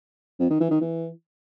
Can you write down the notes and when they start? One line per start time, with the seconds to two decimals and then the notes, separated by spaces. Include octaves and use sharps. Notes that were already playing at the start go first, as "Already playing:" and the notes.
0.40 F2
0.50 D#3
0.61 E3
0.71 D#3
0.81 E3